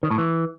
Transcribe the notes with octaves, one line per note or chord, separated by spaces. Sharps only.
D#3
A2
E3